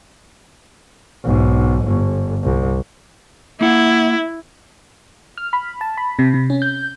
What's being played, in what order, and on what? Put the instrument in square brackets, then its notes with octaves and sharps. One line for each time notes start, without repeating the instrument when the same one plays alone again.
[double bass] B1 G#2
G1
C2
[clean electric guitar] A#3 F#5 [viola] E4
[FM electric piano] F6
B5
A5
B5
C3
C3
C#4
G6